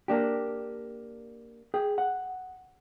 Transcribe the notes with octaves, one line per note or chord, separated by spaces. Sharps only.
A#3 D4 G4
G#4 G5
F#5